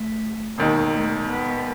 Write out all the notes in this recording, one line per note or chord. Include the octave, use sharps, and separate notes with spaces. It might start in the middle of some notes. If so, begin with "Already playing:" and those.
Already playing: A3
E1 D#2 D#3
A3
B3